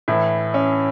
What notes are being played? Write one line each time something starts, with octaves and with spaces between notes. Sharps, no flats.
A2 E3 E4
C#4